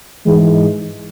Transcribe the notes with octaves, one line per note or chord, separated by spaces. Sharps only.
G#2 E3 G#3